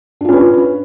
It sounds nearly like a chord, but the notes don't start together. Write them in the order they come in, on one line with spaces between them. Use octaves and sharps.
D4 F4 C#4 B4